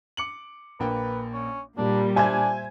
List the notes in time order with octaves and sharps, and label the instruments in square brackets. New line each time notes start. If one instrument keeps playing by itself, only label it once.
[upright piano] D6 C#7 F#7
[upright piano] A#1 A#3 G5 [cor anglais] B4
[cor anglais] C#4
[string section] A#2 G3 [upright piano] A#3 [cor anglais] D4
[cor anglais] D4 [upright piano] C5 E5 [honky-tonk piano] G#5 G#6